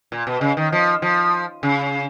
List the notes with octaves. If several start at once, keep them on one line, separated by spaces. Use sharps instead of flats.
A#2
B2
C#3
D#3
F3
F3
C#3